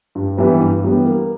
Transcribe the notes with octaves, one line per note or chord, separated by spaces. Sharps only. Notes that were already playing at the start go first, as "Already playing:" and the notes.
G2
E3 G3 B3
G2
E3 G3 B3
A#3